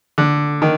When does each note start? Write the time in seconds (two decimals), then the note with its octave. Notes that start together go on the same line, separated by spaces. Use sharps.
0.18 D3
0.62 D#3